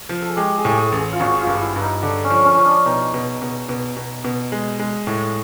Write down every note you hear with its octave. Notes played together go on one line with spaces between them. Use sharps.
F3
A4
G#4
G#3 G4
G#4
A2 G4
G#4
A1
G#4
F4
G#1 F#4
F4
G2
E4
G2
D#4
D3 D4
C#4
F3
C#4
F3
D4
B2 D#4
B2
B2
B2
B2
B2
G#3
G#3
A2